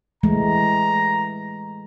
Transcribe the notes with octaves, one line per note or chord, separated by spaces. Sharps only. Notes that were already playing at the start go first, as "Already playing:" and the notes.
E3 G#3 A3 A#5